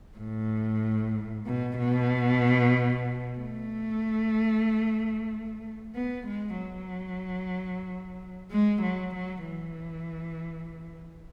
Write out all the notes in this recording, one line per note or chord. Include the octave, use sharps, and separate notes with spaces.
A2
B2
B2
A3
B3
G#3
F#3
G#3
F#3
F#3
E3